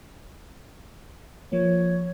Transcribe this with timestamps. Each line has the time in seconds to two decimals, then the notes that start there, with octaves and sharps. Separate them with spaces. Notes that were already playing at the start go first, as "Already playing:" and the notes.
1.52 F3 A#3 C#5